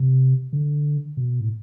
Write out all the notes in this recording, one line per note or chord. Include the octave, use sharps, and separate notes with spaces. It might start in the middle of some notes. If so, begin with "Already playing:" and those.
Already playing: C3
D3
B2
A2